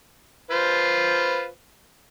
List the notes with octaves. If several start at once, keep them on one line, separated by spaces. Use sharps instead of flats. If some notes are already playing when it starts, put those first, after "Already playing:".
F4 B4 C5